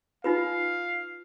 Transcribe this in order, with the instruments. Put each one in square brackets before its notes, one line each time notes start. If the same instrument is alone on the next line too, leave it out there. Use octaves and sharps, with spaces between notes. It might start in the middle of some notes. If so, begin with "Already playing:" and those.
[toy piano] D#4 F4 B4 [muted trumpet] F5